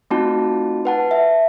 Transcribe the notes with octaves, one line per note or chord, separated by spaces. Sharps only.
A3 C4 D#4 F4 F#4 A5
B4 F#5 A5
E5